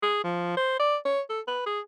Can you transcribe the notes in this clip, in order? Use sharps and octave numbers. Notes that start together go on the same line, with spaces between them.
G#4
F3
C5
D5
C#5
A4
B4
G#4